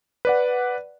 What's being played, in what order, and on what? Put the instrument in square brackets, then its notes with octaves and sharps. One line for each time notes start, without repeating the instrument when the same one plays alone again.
[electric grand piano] B4 D5 F#5